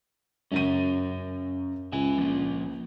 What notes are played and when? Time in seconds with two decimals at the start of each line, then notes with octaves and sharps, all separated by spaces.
0.52 F#2 C#3 C#4 A#4 D#7
1.92 C#2 E5 G#5
2.18 F3 A#3